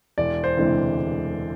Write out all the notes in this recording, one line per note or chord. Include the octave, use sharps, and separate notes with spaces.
E1 D5
C5
D2 C3 E3 G#3